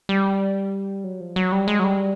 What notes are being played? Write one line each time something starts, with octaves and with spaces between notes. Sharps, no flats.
G3
F#3
F3
F#3
G3
G#3
F#3
G3